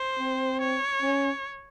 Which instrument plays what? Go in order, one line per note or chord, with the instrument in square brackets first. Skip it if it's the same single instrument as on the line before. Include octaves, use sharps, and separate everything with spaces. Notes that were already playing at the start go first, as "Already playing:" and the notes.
Already playing: [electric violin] C5
[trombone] C4
[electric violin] C#5
[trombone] C#4